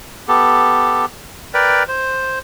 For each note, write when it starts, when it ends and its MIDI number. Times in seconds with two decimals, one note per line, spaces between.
0.28 1.05 59
0.28 1.05 67
0.28 1.05 69
1.54 1.83 70
1.54 1.83 71
1.54 1.83 74
1.54 1.83 79
1.88 2.39 72